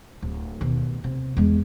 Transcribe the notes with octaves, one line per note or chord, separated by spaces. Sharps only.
D1
D#2 B2
C3
E2 G#3